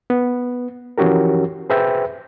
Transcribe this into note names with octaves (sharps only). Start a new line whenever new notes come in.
B3
E3 F3 C#4 F#4 G4 A#4
G#4 B4 C5 E5 G5